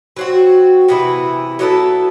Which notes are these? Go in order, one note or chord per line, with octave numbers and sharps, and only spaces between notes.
F#3 C4 F#4
C3 E3 B3 E4
F#3 B3 E4 A4